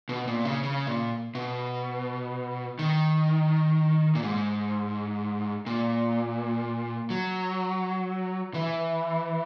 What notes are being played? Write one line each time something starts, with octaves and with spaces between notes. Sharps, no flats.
B2
A#2
C#3
C#3
A#2
B2
D#3
A#2
G#2
A#2
F#3
E3